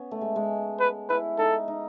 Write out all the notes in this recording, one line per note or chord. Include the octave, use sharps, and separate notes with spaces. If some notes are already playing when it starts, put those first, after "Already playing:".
Already playing: B3 C#4
A3
G#3
G#3
B4
E4 B4
D#4 A4
D#4